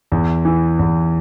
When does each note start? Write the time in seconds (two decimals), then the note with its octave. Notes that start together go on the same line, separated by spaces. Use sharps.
0.12 E2
0.45 E3
0.79 E2